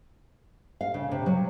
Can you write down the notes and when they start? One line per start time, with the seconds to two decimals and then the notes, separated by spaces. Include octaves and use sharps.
0.81 F5
0.94 C#3
1.11 C3
1.26 F#3